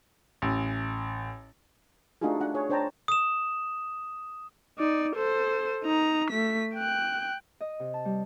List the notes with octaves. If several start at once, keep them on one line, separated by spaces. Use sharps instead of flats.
A1
A3 D4 D#4 F4 F#4 G#4
D4 F#5
G#4 C#5
D4 C5 C#5 G5 A5 A#5
D#6 E7
D#4 D5
A4 C5
D#4 A#5
A3 B6
G5 F#6
D#5
C3
A5
G3